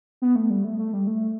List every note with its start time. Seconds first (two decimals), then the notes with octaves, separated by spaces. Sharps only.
0.22 B3
0.36 A3
0.50 G3
0.64 A3
0.79 A3
0.93 G3
1.07 A3